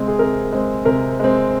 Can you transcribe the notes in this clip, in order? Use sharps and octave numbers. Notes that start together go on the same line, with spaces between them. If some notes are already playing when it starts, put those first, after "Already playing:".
Already playing: C3 G#3 C4
G#4
C3 A#4
G#3 C4
C3 A#4
G#3 C4